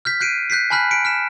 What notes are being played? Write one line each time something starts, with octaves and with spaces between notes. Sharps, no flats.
F6 G6 B6
F#6 G6 C7 D7 D#7
F#6 G6 B6 C7
G#5 A5 B5 F6 F#6 B6
B6 C#7 D7
F6 B6 E7